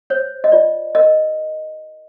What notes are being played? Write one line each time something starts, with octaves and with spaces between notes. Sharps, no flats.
C5 C#5
D#5
F4 D5
A#4 D#5